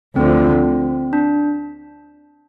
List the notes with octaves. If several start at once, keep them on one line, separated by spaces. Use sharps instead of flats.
D2 D3 F3 C4
D4